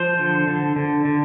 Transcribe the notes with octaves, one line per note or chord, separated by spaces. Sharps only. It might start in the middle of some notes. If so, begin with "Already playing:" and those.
Already playing: F3 C5
D3
D3
D3
D3